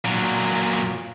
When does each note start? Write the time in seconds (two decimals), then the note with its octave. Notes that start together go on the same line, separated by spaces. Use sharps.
0.05 A#2 F#3